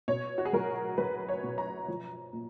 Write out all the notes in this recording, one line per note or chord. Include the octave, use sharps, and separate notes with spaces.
B2 C#5
F#4
G#4
F#3 A#4
F#3 B4
C#5
B2
A#5
F3
A#2